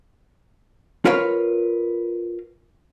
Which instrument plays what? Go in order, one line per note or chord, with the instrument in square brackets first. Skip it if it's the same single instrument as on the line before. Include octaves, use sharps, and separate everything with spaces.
[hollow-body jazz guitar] F4 A#4 B4 C#5 F5